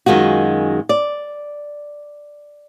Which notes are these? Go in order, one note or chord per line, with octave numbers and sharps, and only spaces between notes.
F#2 D#3 G#3 F4 F#4
D5